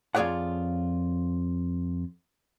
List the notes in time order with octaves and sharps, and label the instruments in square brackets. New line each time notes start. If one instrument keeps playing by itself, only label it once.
[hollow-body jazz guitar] F2 F4 G#4 C#5 D5 F#5